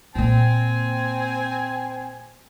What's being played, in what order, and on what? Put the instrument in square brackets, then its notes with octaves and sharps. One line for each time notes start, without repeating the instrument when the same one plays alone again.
[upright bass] A#2 A#3 [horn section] C4 G#5